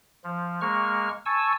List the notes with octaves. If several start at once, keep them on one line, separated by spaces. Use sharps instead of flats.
F3
G#3 A#3 C#6 F6
G#5 A5 C#6 E6